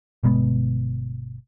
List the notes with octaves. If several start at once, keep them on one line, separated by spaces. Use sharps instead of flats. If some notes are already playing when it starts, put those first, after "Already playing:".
G1 B2 G#3 B3